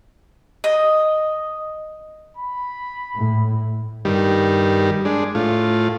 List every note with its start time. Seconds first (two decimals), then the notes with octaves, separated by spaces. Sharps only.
0.64 D#5
2.37 B5
3.15 A2
4.05 G2 D#3 G3
5.05 G#3 D4
5.35 A2 F4